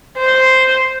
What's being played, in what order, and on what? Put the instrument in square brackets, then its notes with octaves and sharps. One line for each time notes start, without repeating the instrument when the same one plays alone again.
[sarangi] C5